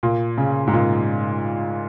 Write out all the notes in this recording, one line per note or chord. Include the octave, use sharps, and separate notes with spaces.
A#2
C#3
G#2
A#2